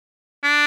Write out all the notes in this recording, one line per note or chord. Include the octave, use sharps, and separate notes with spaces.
D4